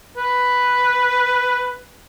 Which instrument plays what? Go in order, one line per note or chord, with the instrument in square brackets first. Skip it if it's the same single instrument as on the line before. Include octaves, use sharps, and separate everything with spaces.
[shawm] B4